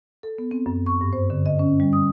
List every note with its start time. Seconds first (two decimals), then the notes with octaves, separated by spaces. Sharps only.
0.23 A4
0.38 B3
0.51 C4
0.66 F#2
0.86 C#6
1.01 G2
1.13 C5
1.30 D3
1.46 D#5
1.59 C#4
1.80 G3
1.93 D#6